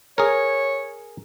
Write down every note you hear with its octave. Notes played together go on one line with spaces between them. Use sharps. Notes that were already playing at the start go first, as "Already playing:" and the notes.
G#4 A#4 C#5